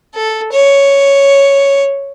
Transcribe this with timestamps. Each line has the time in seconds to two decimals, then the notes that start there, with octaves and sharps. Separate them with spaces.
0.15 A4
0.52 C#5